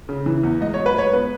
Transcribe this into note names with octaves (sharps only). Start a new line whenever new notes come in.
C#3
E3
E2
G#2 D#5
C#5
F#3
B4
G#2 C#5
B3 B4